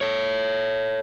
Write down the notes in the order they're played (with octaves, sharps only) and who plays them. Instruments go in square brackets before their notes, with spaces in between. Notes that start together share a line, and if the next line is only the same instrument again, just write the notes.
[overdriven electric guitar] A4 C#5